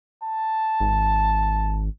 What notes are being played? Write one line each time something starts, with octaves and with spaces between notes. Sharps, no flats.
A5
G#1